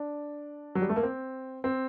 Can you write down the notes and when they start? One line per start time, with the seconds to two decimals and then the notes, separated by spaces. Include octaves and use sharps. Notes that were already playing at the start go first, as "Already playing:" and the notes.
Already playing: D4
0.75 F#3
0.82 G3
0.89 A3
0.96 A#3
1.03 C4
1.64 C4